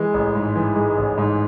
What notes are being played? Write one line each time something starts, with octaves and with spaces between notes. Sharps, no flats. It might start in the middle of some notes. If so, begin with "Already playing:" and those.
Already playing: E3 G#3
A1
G#2
E3
G#3
A1
G#2